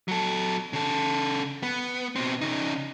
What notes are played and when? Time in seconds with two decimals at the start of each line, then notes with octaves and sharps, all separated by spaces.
0.08 F#3 A4
0.73 C#3 A4
1.63 B3
2.16 B2 C4
2.41 C#3 D#4